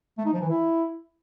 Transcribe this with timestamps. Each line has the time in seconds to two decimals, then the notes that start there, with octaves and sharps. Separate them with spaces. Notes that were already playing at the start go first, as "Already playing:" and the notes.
0.18 A3
0.26 D#4
0.34 F3
0.41 E3
0.49 E4